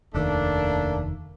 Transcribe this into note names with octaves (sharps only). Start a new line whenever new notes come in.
F1 D#2 D#3 A3 A#3 D4